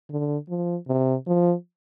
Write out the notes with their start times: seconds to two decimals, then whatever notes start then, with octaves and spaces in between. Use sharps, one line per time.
0.10 D3
0.49 F3
0.88 C3
1.27 F3